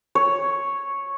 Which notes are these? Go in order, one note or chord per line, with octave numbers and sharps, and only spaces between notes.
C#5